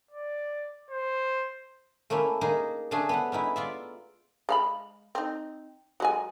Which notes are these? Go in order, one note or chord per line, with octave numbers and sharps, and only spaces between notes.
D5
C5
A3 A#3 C#4 E4
A#3 D#4 G#4 A#4
C#3 A3 D4 G#4 A4
B3 B4 F#5
C#4 D#4 E4 B4
F4 D5 E5
G#3 F5 B5
C4 D#4
F#3 G#3 G#5